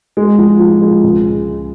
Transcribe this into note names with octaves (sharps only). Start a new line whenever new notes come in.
G#3
F3
F3
G#3
C#2